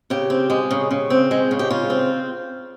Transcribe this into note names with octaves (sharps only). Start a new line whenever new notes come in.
C#3 G4
C4
G#3
C#3
C#3
C4
G#3
C#3
G4
C#3 F4
C4